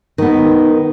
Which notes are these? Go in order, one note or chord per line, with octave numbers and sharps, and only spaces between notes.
D#3 B3